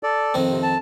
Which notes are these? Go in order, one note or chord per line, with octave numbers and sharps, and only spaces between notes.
A4 D5
F2 D#3 C4
C3
A5